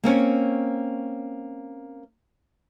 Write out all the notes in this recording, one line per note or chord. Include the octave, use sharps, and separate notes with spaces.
A#3 C4 C#4 C#5